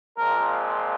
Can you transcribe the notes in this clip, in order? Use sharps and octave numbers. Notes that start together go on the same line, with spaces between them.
A#2 F3 G#3 C4 A#4